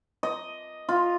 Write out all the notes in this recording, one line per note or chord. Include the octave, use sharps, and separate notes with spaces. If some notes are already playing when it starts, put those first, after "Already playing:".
D#5
F4